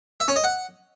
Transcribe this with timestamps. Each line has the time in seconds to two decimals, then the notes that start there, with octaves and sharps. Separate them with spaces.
0.20 E5
0.28 C#4
0.36 D#5
0.44 F#5